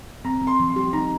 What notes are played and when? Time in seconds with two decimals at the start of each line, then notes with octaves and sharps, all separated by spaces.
0.25 C4 A#5
0.42 C4
0.47 C6
0.60 F3
0.70 C6
0.76 G4
0.93 D#4 A#5